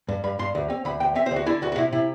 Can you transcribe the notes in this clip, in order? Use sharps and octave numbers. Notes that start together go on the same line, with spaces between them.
G2
G2 B5
G2 C6
D2
C4
D2 B5
D2 G5
C4 E5
C5
D2
F#4
D3 E4
D2 F#4
F#4
C3 E4
C3 E4